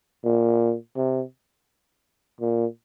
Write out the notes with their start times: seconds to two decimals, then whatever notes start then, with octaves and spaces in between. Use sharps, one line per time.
0.24 A#2
0.96 C3
2.40 A#2